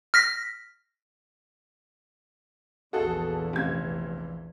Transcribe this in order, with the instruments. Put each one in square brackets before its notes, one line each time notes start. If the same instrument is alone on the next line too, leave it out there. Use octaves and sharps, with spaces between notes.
[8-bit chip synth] F6 A#6 B6
[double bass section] A#1 E2 E3 [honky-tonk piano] F#4 G#4 A4
[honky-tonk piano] F1 G#6